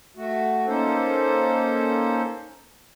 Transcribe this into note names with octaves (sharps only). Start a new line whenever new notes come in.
A3 F#4
A#3 C#4 D#4 A4 C5